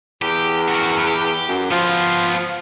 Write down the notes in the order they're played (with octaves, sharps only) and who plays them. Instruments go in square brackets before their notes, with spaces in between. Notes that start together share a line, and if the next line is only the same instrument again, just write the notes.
[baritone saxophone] E2 [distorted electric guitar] G4
[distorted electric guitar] F#4 A#4
G4
[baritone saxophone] F#2
[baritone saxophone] F3 [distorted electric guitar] B3 F4